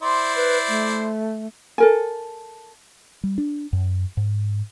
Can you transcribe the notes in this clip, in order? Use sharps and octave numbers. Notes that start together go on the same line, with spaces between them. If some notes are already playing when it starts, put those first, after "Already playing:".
E4 C5 D5 C6
B4
A3
A4 A#4 G#5
G3
D4
F#2
G#2